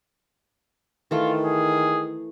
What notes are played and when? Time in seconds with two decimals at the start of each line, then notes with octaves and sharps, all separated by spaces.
1.11 D#3 E3 A3 F4
1.44 G#4